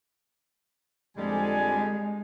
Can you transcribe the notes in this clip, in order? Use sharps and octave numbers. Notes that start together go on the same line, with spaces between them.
F2 D3 G3 G#3 G#5